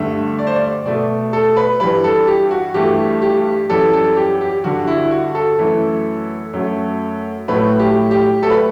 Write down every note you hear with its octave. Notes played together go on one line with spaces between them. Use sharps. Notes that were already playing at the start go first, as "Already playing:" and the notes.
Already playing: G2 D3 A3 E5
D5
C5
D5
B2 A3 D5
A4
B4
G2 E3 G3 B4
A4
G4
F#4
G2 E3 A3 G4
G4
F#2 E3 G3 A4
A4
G4
G4
G2 D3 G3 F#4
E4
F#4
A4
F#2 E3 A3
F#2 F#3 A3
A2 F#3 A3 B4
G4
G4
F#3 A3 A4
B4